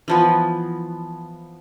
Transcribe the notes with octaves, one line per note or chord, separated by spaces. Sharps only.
E3 F3 B3